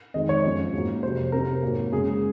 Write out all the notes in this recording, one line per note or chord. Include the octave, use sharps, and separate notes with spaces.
F2 D#3 G#3 C4 D#5
C#5
F#2 F3 C4
G#2 F#3 A#3
F2 C3 F#3 C5
C3 F#3 C4 A#4
G#2 F#3 A#3
F#2 C#3 G#3 G#4